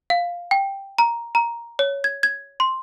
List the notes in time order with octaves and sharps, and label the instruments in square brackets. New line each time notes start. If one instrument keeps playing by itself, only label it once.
[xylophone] F5
G5
A#5
A#5
C#5
G#6
G#6
C6